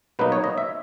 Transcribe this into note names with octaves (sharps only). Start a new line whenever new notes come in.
B2 F#3 A#3 D#4 B4
C#5
D#5
E5